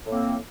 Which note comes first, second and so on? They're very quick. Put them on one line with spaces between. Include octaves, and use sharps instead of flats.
A2 A#3 C4